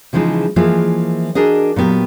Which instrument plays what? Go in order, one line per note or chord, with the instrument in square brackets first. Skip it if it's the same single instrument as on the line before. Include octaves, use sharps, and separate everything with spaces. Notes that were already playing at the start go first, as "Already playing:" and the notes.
[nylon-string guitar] C#3 E3 F3 G#3 D#4
E3 F3 G#3 A#3 E4
D4 F#4 G#4 A#4 D#5
A#2 F#3 B3 G4